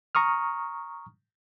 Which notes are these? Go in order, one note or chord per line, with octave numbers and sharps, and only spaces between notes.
A#5 C#6 D#6 F6